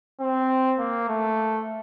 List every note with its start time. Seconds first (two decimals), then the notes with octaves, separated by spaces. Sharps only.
0.20 C4
0.79 A#3
1.09 A3